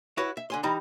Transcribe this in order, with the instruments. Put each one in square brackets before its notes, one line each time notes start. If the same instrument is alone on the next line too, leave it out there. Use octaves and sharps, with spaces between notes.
[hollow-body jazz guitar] E4 F#4 B4 C#5 F#5
E5
D3 G#5 C6
E3 G3 D#4 A#5